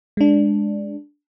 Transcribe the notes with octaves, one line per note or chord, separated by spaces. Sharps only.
G#3 D4